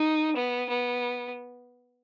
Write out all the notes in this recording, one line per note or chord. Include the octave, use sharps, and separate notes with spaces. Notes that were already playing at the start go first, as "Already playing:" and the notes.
Already playing: D#4
B3
B3